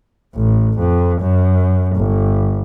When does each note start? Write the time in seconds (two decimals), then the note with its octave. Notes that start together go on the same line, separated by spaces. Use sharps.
0.36 A1
0.79 F2
1.21 F#2
1.95 G1